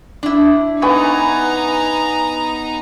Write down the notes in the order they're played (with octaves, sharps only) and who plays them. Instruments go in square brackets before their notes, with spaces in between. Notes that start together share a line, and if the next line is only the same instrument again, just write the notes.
[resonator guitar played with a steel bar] D4 E4
[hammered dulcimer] B3 G#5 C#6 [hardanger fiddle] D#4 A#5